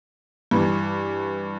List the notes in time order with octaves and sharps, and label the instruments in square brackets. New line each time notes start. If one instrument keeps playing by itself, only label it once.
[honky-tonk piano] G2 E3